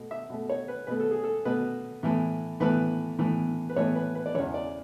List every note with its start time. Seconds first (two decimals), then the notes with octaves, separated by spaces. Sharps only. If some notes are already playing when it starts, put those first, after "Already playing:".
Already playing: B2 A3
0.11 E5
0.30 B2 A3
0.50 C#5
0.68 B4
0.87 B2 A3 B4
1.00 A4
1.11 G#4
1.24 A4
1.45 B2 A3 B4
2.03 A2 E3 B3
2.60 A2 E3 B3 B4
3.19 A2 E3 B3
3.69 B4
3.76 A2 E3 B3 C#5
3.95 B4
4.15 B4
4.26 D5
4.34 E2 C#3 E3 C#5
4.54 D5